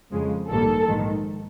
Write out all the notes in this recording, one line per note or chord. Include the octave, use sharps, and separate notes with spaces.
F2 C#3 F3 G#3
A#1 G#2 D#3 G3 A#3 A4
A#1 G#2 D#3